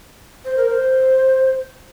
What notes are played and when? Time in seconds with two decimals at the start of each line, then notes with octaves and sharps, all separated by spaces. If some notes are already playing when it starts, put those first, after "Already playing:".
0.45 C5
0.57 A#4
0.70 C5